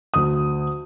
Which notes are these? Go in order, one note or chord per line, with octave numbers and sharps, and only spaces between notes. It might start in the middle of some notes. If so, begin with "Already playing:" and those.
D2 D#6